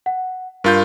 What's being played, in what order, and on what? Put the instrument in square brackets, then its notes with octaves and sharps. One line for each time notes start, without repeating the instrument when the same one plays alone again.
[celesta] F#5
[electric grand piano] G2 F4 G6 [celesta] A#4